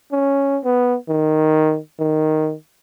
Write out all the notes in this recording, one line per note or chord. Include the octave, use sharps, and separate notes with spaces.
C#4
B3
D#3
D#3